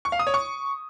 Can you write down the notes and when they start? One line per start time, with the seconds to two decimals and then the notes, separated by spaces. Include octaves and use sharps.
0.05 C#6
0.12 F5
0.19 D#6
0.27 C#5
0.34 C#6